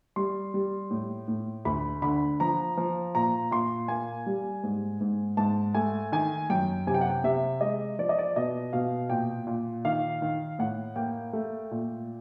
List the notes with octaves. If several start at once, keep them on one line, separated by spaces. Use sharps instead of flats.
G3 C6
G3
A2
A2
D2 B5
D3 B5
F3 A#5
F3
A#2 A#5
A#2 C6
A#3 G#5
G3
G#2
G#2
G#2 A5
A3 G#5
D#3 G#5
F#2 G5
C3 G#5
G5
F#5
G5
C3 E5
G#3 D#5
F3 D5
D#5
D5
B2 D#5
B2 F5
A#2 G5
A#2
D#3 F5
D#3
A2 F#5
A#3 G5
A3
A#2